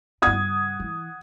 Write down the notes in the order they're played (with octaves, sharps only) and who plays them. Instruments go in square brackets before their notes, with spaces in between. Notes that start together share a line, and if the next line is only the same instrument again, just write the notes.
[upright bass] G2 C#3 [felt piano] F#5 D#6 G#6
[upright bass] E3